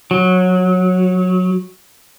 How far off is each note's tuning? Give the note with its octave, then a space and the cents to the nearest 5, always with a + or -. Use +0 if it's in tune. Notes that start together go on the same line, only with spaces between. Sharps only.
F#3 -15